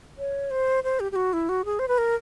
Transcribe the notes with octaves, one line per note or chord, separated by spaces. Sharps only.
C#5
C5
C5
G4
G4
F#4
E4
F#4
G#4
C5
B4
A#4